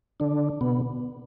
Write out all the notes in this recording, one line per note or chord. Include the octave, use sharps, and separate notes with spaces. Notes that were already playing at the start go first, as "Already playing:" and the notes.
D3 D4
B2 B3